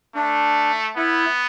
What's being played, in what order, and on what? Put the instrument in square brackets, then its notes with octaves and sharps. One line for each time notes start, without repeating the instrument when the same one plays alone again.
[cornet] A3 [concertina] D4
[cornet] B3 [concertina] E4